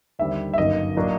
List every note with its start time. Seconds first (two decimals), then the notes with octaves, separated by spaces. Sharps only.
0.19 D#2 D3 G3 C4 E5
0.54 E5
0.58 G1 F#2 D#3 F#3 A#3 D#5
0.96 A2 F#3 A#3 D4